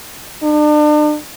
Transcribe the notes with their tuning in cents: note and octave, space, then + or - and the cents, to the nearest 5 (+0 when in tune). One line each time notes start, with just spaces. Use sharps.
D4 +40